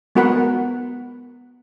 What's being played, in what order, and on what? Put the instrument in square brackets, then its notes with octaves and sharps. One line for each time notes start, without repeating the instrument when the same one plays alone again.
[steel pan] G#3 B3 F#4 A#4 F#5 B5